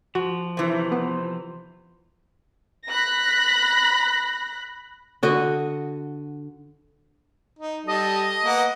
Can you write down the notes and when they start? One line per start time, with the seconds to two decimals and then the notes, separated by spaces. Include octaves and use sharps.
0.15 F3 F#4
0.57 C3 E3 C5
0.92 B3
2.89 B5 F#6 A#6
5.23 D3 F#4 D#5
7.59 D#4
7.87 G3 A4 D#5
8.44 A#3 B3 F#5